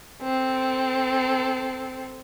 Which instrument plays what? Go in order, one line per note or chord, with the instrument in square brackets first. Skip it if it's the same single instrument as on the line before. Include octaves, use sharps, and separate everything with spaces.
[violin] C4 A4